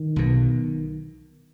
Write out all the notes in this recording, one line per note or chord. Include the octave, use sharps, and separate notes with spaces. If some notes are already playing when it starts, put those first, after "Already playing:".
Already playing: D#3
B1 B2